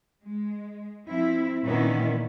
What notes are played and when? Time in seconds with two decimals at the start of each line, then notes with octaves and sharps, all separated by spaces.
0.24 G#3
1.07 F3 C4 E4
1.64 A#2 D#3 E3 B3 C#4 E4